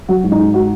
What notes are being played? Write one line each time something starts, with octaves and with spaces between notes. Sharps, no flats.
F#3 F#4
G#2
D#4
G#2
G#3 F#4